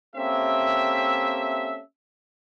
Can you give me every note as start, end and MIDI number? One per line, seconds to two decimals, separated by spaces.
0.16 1.81 58
0.16 1.81 60
0.16 1.81 61
0.16 1.81 67
0.16 1.81 69
0.16 1.81 76